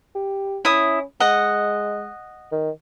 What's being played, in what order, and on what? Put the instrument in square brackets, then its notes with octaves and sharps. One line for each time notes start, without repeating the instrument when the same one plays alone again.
[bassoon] G4
[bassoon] C#4 [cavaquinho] E4 D#6
[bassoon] G#3 [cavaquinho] D#5 F#5
[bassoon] D#3